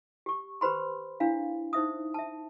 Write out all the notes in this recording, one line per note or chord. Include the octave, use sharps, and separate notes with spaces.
G4 C#6
G4 B4 C5 B5 C6
D4 E4 F5
D#4 C5 E5 D#6
E5 A5